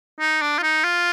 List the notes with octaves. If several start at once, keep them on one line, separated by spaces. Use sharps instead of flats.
D#4
D4
F4
D#4
F4